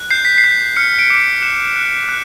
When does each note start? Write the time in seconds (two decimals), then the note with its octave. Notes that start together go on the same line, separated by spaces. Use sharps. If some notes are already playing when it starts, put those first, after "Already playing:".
Already playing: F#6
0.11 G6 C7
0.25 B6
0.38 C7
0.44 G6
0.76 F6 C#7
0.99 D7
1.10 D6
1.42 F#6 E7
1.76 F#6
2.09 F#6